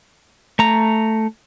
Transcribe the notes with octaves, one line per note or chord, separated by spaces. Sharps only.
A3 A#5